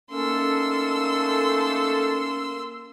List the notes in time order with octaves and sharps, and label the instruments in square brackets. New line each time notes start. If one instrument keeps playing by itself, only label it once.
[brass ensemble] A3 D#4 A4 [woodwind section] A#3 C#4 [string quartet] C6 E6